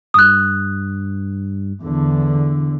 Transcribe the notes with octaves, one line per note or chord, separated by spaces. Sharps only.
G2 D#6 F#6
E2 D3